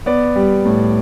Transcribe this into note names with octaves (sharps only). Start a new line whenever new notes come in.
B3 D5
G3
A2